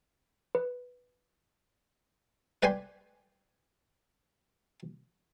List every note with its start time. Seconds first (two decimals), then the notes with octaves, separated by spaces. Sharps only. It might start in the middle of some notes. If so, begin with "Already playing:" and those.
0.55 B4
2.63 B4 D5 G5 G#5 C6